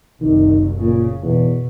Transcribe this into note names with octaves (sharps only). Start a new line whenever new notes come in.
F#1 C2 D#3
A#2 C#3
E2 B2